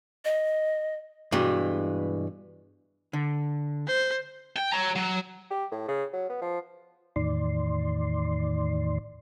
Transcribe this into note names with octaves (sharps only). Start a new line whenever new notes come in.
D#5
G2 B2 E3 G#3
D3
C5
G5
C#5 A#5
F#3
G4
A2
C#3
F#3
B3
F3
E2 A2 D#3 D5 C6